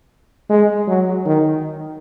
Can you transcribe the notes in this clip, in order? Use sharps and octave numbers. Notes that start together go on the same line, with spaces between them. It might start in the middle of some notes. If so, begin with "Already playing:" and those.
G#3
F#3
D#3